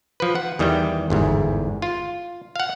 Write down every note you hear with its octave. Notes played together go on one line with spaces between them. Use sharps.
F3 B4
F#5
E2 D#3 G3 B3 G5
G1 E2 G#2
F4
F5 F#5